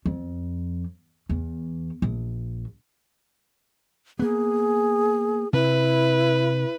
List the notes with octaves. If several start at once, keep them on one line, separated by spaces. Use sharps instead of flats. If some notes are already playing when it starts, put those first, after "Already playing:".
F2
E2
A#1
A#3 B3 G#4
C3 E4 B4